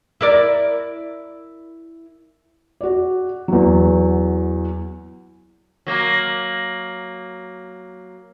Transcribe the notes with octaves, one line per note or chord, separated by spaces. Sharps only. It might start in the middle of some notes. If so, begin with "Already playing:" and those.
E4 A#4 D5
F#4 D5
E2 F#3
F#3 A#3